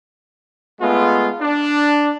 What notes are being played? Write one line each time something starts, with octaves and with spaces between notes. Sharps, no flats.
G#3 A3 B3 F4
D4